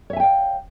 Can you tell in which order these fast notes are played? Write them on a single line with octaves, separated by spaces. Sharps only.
C#5 E5 G#5 G5 F5